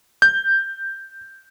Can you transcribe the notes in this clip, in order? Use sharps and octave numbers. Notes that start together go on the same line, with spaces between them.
G6